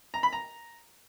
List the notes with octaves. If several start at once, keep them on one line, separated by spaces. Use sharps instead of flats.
A#5
B5
A#5